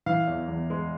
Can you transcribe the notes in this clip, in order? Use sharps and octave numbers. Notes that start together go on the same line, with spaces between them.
E3 F5
E2
E2
G#3